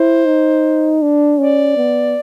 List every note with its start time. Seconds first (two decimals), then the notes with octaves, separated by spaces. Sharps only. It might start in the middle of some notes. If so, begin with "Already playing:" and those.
Already playing: E4 C5
0.26 D#4
1.02 D4
1.38 C#4 D5
1.77 B3